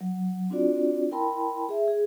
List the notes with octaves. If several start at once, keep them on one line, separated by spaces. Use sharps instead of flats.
F#3
C4 D4 F4 F#4 D5
E4 A#4 G5 A5 B5 C6
G#4 E5
G#4